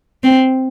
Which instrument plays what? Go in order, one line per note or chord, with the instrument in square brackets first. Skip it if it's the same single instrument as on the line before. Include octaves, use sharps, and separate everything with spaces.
[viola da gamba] C4